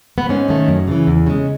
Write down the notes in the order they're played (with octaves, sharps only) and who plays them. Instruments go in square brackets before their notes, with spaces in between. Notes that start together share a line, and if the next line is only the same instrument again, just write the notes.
[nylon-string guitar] B3
G#2 C#4
D#3 A3
F#2
C#3 E3
E2
C#3 G#3